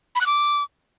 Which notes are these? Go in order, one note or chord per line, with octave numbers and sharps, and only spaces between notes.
B5
F#6
D6